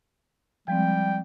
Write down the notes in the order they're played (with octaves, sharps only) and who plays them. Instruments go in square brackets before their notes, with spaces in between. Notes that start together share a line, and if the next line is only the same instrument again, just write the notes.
[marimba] F3 G#3 C4 [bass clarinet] G3 [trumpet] G5